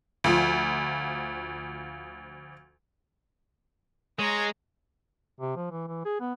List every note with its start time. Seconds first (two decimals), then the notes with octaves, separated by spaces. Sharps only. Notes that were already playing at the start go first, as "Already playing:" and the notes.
0.24 D2 F3
4.19 G#3 C#5 A#5
5.40 C3
5.56 F3
5.71 E3
5.87 E3
6.05 G#4
6.20 B3